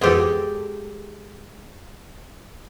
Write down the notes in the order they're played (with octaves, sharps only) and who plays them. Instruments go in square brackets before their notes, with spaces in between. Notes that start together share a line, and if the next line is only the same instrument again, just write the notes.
[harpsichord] F2 B2 F3 [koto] G#3 G4 A4